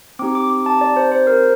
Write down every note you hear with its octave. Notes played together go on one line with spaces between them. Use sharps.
C4 D#4 G4 D6
D6
D6
A5
D5
C5
C5
A#4